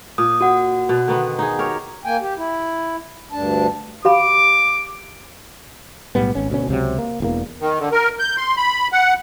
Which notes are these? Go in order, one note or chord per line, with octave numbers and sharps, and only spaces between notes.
A#2 D#6
F#4 F#5
B2 B3
D3 D#3 B3
D#4 G#4
G4 A#4 C#5
A#3 G5 G#5
G4
E4
D2 G2 D4 A5
G4 F5 B5 D6
B1 A2 G3 B3
G#1 C#4
D2 B2 C#4
C#2 C3 F#3
A#3
E1 E2 A#3
D#3
D3
A#4
G6
C6
B5
F#5